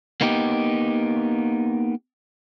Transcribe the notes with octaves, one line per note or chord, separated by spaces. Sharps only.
A#3 B3 D#4 G4